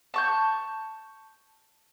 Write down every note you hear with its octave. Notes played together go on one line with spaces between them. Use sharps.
A5 C#6 G6